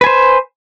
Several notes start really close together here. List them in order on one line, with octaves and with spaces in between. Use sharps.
B4 G#5 C5